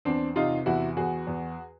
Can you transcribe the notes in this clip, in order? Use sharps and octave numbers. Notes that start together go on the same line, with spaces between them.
E2 C4 D4
C3 D#4 F4
E2 E4 F#4
E2 F#4 G#4
E2